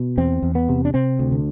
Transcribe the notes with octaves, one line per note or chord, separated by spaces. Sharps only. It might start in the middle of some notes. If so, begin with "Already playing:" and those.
Already playing: B2
E2 C4
E2
B3
C3
D4
C3 C4
D2
D3